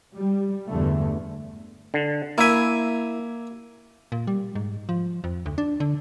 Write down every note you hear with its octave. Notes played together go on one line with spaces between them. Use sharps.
G3
E2 G2 D3 A3
D3
A#3 E4 E5 G#5
A#2
G3
G#2
F3
F2
D2
D4
D3